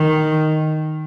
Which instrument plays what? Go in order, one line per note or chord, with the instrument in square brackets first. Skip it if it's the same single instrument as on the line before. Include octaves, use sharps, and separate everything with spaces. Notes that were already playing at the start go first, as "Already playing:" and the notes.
Already playing: [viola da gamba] D#3